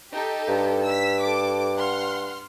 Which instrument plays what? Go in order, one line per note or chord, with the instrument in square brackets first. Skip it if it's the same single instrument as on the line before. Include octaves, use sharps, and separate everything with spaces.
[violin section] D#4 G4 A4
[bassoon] G2
[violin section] E6 B6
A4 D6
F#5 C6 F6